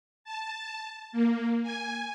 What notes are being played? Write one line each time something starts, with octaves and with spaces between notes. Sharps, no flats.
A5
A#3
G#5